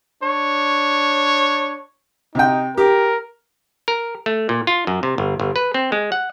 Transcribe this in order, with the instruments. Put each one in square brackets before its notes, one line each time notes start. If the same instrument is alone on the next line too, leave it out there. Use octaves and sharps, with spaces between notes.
[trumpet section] D4 C#5
[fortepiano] C3 G5 [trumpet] D#4
[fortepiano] G4 [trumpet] A#4
[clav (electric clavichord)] A#4
A3
A#2
F4
F#2
C3
G1
G1
B4
C4
G#3
F#5